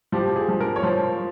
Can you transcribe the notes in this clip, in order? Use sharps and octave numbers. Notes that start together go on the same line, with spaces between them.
F3 G4
G#4
F3
A#4
C#5
F3 C5